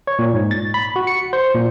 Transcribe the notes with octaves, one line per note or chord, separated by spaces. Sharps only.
C#5
A#2
G#2
A6
B5
F#4
C#7
C5
A#2